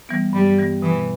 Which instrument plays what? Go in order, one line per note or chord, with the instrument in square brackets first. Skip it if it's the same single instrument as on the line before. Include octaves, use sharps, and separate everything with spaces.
[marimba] E3 G3 B3
[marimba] G2 [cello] G3
[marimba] E3 G3 B3
[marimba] B2 [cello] E3